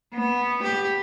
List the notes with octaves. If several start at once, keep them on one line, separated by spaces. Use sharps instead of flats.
B3
G4